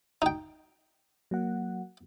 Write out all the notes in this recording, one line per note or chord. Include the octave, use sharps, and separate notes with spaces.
D#4 G5
F#3 A#3 F#5